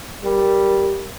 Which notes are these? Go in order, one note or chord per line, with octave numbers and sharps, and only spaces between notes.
G3 A#4